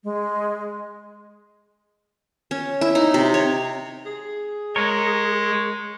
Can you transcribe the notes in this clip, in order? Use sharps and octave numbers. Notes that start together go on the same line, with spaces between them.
G#3
C#4
E4
D#4
C3
C#5
G#4
G#3 A#4 C#5